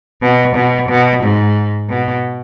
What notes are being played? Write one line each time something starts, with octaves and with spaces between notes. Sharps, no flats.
B2
B2
B2
G#2
B2